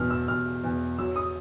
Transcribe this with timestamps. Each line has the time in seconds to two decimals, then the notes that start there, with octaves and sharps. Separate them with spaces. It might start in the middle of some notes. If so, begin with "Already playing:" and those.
Already playing: E2 B2 F6
0.10 E6
0.28 E2 F6
0.64 E2
0.98 F#3 E6
1.16 D#6